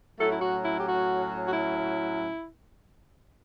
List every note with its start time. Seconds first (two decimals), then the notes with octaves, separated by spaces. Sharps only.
0.19 A2 F#3 A3 C#4 E4 A4
0.31 E4
0.41 F#4
0.63 E4
0.78 G4
0.86 F#4
1.46 F#4
1.52 E4